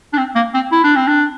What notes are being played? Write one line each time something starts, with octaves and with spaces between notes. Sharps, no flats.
D4
C4
A#3
C4
E4
D4
C4
D4